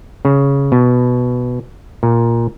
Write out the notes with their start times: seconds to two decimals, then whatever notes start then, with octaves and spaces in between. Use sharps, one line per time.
0.25 C#3
0.72 B2
2.03 A#2